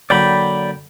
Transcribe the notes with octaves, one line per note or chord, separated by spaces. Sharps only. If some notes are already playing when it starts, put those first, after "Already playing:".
D3 F#3 A#3 D5 G5 B5